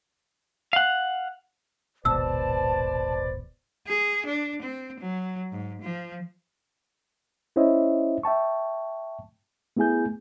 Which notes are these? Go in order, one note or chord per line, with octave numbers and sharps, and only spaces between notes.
F5 F#5
D#1 G#1 B2 B4 C5 D5 A5 E6
G#4
D4
C4
F#3
G#2
F3
C#4 E4 C5 C#5 D#5 E5
E5 G5 A5 C#6
A3 B3 E4 G#4 G#5 G6